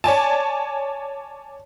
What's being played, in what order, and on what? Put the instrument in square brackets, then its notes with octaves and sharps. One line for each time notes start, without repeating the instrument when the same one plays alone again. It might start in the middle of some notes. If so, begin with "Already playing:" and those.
[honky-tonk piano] C#5 D5 G#5 A5